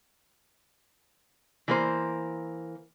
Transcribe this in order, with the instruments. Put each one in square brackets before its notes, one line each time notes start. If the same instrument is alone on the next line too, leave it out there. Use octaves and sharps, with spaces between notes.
[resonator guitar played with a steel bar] E3 A#3 C5